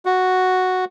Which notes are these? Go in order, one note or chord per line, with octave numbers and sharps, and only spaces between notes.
F#4